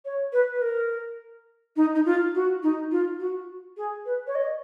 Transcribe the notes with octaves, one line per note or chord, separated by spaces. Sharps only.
C#5
B4
B4
A#4
D#4
D#4
F4
F#4
D#4
F4
F#4
G#4
B4
C#5
D#5